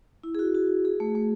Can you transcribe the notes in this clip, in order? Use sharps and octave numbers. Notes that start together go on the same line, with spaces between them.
E4
G#4
F#4
F#4
G#4
A3
A3